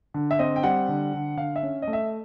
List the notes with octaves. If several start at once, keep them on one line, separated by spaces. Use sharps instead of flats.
D3
E5
C4 D#5
G5
G3 F#5
D3
D3
D3 F5
E5
C#4
D#5
A3
E5